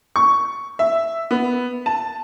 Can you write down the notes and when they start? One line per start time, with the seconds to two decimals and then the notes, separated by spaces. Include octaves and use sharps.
0.16 C#6
0.79 E5
1.31 B3
1.86 A5